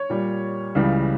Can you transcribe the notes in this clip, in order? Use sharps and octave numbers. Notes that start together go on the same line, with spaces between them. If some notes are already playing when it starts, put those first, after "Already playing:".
Already playing: C#5
A#2 G3
C#2 C#3 E3 G3